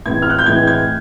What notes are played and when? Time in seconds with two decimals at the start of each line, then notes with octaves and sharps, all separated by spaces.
0.06 A2 E3 G#3 C4 G#6
0.22 F6
0.30 F#6
0.39 G6
0.46 A2 E3 G#3 C4 G#6
0.67 G#6